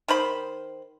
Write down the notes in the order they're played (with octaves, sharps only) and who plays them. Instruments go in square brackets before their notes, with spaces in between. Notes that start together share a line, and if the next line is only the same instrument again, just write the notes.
[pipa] D#3 C5 B5